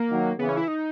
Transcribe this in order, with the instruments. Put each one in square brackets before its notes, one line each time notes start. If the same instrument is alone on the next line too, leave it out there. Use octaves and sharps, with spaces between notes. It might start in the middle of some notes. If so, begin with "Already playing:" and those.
Already playing: [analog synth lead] A#3
[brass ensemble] D#3 F#3
[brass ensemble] C#3 E3 [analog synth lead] B3
[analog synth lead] C#4
E4
D#4